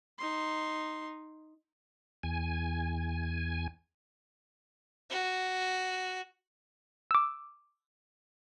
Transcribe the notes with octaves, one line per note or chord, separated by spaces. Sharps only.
D#4 C6
E2 G#5
F#4
D6 E6